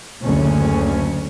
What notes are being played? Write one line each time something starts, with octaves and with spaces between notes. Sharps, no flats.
F#1 D2 C#4